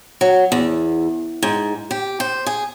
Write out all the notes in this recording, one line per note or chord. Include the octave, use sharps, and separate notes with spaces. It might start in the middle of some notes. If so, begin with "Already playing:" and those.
F#3
E2
G#2
G4
C5
G#4